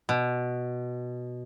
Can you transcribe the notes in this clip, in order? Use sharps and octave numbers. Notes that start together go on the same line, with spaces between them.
B2